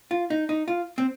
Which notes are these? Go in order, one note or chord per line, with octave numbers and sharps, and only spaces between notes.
F4
D#4
D#4
F4
C4